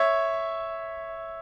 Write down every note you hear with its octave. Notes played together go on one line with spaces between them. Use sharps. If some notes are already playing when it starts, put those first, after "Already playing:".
Already playing: C#5 E5